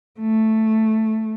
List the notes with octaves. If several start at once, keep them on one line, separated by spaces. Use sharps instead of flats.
A3